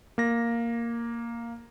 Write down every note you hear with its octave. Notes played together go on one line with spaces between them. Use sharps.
A#3 A#6